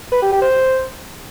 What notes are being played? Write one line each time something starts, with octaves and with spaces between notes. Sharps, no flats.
B4
G4
G4
C5